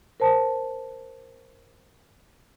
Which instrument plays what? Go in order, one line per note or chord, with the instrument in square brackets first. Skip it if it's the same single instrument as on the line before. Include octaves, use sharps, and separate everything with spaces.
[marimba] A#4 C5 A5